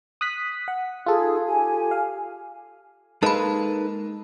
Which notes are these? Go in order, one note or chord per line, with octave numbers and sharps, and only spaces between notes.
D#6 F#6 B6
F#5
D#4 F4 G#4 A4
G4 G#5
F5
G#3 A#3 D#4 A4 B4 A5 B5